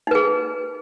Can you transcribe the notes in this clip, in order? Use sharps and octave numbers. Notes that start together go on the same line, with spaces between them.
D#4 G#4 B4